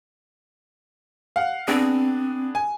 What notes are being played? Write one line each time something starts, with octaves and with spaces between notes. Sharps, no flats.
F5 F#5
B3 C4 D4 G#4
G#5